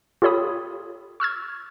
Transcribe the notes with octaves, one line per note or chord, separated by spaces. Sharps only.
F4 G4 A4 C#5 B5 D#6
C#6 E6 F6 G#6